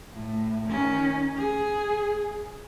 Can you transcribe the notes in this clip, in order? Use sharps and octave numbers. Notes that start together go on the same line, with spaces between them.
A2
D#3 C#4
G#4